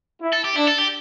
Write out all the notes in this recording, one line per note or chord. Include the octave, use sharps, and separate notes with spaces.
E4
A4
G4
D4 E4
A4
G4